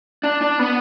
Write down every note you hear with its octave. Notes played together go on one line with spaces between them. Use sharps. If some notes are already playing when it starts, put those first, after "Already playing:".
D4
D4
B3